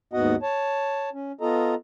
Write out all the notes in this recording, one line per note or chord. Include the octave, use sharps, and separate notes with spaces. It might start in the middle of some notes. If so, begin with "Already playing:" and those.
D#2 G#2 B3 F#4 D#5 F#5
C#5 A5
C#4
B3 F4 A4 D#5 A#5